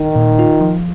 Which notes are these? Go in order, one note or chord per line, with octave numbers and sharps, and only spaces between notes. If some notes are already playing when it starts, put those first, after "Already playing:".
Already playing: D#3 D#4
A#2
F4
F3